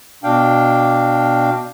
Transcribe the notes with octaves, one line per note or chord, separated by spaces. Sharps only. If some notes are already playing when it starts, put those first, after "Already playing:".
B2 D4 F5 G5